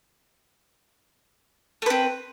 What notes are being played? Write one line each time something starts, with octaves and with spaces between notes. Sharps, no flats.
A3 C4 B4